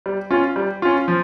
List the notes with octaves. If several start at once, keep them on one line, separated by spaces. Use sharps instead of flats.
G3
C#4 F4
G3
C#4 F4
F3